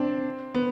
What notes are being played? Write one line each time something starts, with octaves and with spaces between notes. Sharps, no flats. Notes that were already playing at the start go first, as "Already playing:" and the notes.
Already playing: C4 D4
B3